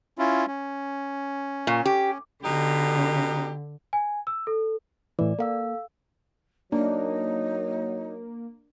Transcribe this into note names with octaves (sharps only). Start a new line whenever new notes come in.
C#4 E4 F4
C#4
A#2
G4
B2 D3 D#4 G4
G#5
E6
A4
A2 E3 D5
A#3 A4 F5 E6
F#3 A#3 D4 D#4